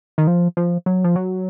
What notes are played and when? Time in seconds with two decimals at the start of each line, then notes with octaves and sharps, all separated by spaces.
0.18 D#3
0.27 F3
0.57 F3
0.86 F#3
1.04 F3
1.16 F#3